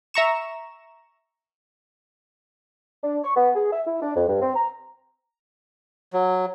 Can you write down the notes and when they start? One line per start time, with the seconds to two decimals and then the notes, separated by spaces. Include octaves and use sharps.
0.14 E5 A#5 C#6 E7
3.04 D4
3.24 C#6
3.36 B3
3.56 G#4
3.73 E5
3.87 E4
4.02 D4
4.17 F2
4.29 G2
4.42 C4
4.56 A#5
6.13 F#3